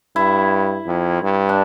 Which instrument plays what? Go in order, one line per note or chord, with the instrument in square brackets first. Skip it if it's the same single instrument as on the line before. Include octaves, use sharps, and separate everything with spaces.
[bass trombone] G2 [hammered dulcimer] E4
[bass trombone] F2
G2
[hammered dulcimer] D4